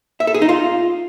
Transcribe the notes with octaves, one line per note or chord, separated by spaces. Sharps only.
E5
A4
G#4
D#4
F4